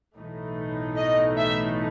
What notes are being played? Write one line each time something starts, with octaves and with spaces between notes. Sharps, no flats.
B1 A2 E3 A3 D#4
D#5
E5